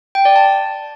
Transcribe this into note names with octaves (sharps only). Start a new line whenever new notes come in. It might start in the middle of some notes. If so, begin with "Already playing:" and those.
G5
D5
A5